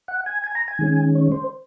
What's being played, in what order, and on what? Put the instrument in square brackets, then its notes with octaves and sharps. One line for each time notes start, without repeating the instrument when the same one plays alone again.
[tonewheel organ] F#5
G#5
G#5
A#5
G#5
D#3 G#3 C#4
C#5
C5